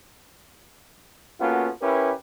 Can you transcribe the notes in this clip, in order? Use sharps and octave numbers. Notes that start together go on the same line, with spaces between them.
A#3 B3 C#4 F4 F#4 A4
C#4 E4 G4 A#4 B4